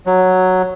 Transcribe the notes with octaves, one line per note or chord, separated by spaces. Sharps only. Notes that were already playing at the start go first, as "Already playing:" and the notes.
F#3